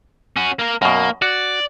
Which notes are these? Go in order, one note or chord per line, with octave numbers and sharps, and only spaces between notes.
C#4 F#4
A#3 A#4
F#2 B2 A#3
F#4 D5